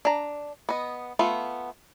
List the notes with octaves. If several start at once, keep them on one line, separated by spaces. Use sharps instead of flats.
D4 A#5
B3 D#5
A3 B3 F4